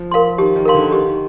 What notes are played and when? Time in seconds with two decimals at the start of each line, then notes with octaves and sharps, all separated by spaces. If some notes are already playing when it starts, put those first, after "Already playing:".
Already playing: F3
0.12 A#4 F5 C6
0.38 D#3 G4
0.56 D#3
0.66 A#4 F5 C6
0.74 D3
0.92 D#3 G4